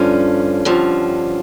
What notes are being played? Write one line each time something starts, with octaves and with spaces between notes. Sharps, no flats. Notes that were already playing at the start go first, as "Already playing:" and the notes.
Already playing: G2 D3 F3 C#4
G2 D3 F3